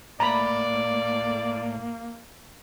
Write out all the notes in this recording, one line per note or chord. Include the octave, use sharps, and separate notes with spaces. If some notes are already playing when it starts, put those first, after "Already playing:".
A2 A#3 D5 A#5 B5